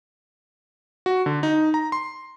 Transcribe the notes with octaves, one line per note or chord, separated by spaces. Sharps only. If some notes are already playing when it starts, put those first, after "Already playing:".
F#4
D3
D#4
A#5
C6